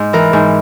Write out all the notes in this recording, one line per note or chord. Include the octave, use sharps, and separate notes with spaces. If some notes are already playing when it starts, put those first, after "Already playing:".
Already playing: G#2
E3 A#4
G#2